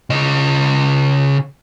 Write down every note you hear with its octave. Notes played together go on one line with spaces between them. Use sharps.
C#3 D#5